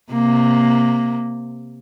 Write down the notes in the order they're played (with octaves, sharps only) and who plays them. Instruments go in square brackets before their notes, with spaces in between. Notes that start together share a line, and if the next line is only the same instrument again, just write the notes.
[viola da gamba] C3 A#3